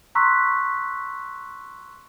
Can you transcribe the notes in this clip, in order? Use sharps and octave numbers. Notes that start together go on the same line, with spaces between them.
A#5 C6 C#6 E6 F#6 B6